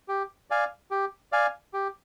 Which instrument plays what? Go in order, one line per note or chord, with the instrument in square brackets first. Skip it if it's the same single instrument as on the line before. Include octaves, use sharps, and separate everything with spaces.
[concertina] G4
D5 F5 G#5
G4
D5 F5 G#5
G4